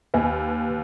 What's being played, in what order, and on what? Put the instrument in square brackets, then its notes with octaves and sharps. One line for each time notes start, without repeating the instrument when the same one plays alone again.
[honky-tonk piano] D#2 [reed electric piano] B4 G#5